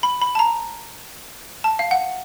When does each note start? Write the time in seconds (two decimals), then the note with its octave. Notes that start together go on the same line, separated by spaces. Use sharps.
0.03 B5
0.22 B5
0.35 A5
0.39 A#5
1.64 A5
1.79 F5
1.91 F#5